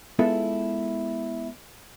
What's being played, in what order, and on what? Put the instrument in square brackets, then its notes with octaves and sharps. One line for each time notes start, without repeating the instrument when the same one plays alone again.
[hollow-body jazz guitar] G#3 B3 E4 F4 A4 E5